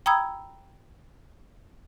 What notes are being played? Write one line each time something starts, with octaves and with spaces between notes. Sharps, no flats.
G5 A#5 B5 D#6 E6 G#6